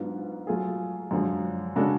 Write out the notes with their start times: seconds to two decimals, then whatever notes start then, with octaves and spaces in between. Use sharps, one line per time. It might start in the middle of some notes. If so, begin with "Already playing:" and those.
Already playing: G#2 F#3 B3 D4 F4
0.47 F#3 A3 F4 G#4
1.11 F#2 D3 F3 G#3
1.76 C#3 G#3 D4 F#4 A4